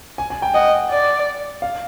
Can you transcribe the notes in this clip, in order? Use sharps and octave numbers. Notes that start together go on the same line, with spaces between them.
G#5
G#5
G5
D#5 F#5
D5
F5